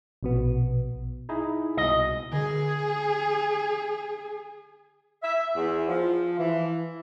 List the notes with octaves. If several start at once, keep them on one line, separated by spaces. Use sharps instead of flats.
A#1 B2 B3
D#4 E4 G#4
C2 B2 D#5
D3 G#4
E5
E2
F3
E3